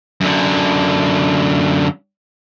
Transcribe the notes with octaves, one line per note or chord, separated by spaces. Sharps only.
F#2 D3